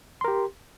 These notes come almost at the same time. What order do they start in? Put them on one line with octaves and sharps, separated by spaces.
C6 A#4 G4